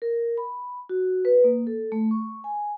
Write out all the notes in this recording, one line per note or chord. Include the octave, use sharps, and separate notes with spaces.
A#4
B5
F#4
B4
A#3
A4
A3
C#6
G#5